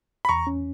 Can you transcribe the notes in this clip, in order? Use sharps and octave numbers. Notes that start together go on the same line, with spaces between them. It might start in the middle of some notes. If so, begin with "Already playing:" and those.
B5
E2 A#5 C#6
C#4